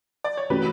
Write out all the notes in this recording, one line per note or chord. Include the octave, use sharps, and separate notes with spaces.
D5
C#5
E3 A3 C#4 F#4 G4 B4